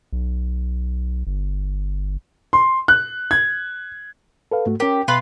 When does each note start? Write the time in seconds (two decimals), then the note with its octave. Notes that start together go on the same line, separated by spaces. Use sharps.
0.13 B1
1.27 G1
2.53 C6
2.88 F#6
3.31 G#6
4.51 A4 B4 F5
4.66 G#2 A3 F#4
4.80 C#4 G4 A#4
5.08 B2 F4 B4